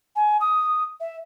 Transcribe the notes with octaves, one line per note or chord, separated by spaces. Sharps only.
G#5
D#6
E5